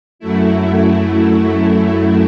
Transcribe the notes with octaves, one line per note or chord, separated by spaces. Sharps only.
F#2 F#3 A3 E4